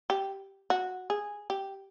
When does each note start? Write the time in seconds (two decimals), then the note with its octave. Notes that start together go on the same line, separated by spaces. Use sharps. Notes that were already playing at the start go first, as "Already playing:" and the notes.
0.10 G4
0.70 F#4
1.10 G#4
1.50 G4